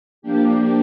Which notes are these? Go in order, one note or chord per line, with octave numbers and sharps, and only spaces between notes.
F3 A#3 D4 G4